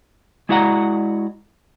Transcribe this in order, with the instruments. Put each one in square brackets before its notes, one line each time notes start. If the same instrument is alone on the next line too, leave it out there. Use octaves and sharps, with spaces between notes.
[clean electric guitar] G#3 E4 F#4 D5 F#5 A#5